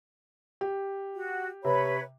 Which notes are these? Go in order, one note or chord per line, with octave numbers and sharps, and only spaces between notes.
G4
F#4
C3 B4 C#5 B5